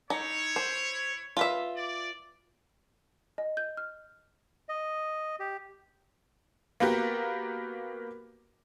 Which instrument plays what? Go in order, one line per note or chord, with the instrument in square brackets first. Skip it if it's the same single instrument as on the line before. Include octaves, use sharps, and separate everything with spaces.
[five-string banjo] D#4 [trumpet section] E4 C#5
[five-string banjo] C5
F4 B4 E5
[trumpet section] D5
[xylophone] D#5
G6
F6
[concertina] D#5
G4
[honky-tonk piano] A#3 B3 F#4 G4 A#4